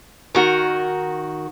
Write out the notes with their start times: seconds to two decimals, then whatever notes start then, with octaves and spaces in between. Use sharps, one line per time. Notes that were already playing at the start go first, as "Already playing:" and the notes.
0.35 D#3 F#4 A#4